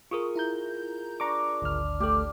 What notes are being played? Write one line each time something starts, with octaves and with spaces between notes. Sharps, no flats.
F4 G#4 A#4 C#6 D#6
E4 A#5 G6
D4 A#5 C#6 D6
G#1 D2 F6
A3 G4 A4